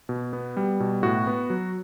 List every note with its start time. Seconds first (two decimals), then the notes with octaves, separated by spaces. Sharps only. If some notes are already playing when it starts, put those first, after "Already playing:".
0.09 B2
0.33 B3
0.57 G3
0.80 B2
1.03 A2 F#4
1.27 B3
1.50 F#3